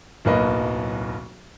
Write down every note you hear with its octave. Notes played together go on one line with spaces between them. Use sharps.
D1 B1 A#3 B4 D#5 B5